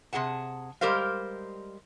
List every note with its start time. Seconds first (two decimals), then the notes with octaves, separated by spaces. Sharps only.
0.13 C3 G#3 G#4 F#5 A5
0.81 G3 G#3 G4 A#4 C5 F5